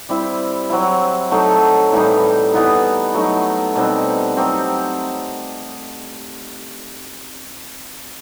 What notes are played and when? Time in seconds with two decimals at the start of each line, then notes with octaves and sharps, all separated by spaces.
0.09 G3 C4 E4
0.70 F#3 C4 E4
1.31 F#3 A3 D#4 A4
1.92 A2 E3 G3 D#4
2.53 E3 B3 D#4
3.14 F#3 A3 D#4
3.75 B2 G3 C4 D#4
4.37 F#3 C4 D#4 G4